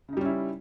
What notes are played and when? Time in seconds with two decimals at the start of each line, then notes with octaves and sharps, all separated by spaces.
0.08 C#3
0.13 D#4
0.17 G3
0.21 C#4
0.25 E4